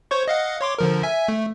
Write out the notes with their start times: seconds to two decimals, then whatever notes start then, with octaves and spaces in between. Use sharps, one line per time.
0.11 C5 C#5 C#6
0.28 D#5 F5 F#5
0.61 C#5 C6 D6
0.79 D3 F3 A#4
1.03 E5 G#5
1.28 A3